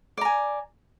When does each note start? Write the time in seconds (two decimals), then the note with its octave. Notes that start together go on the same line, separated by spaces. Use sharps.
0.18 D5
0.21 A#5
0.25 G#5